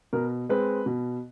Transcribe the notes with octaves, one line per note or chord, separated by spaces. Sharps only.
B2 A#4
G#3 C4 B4
B2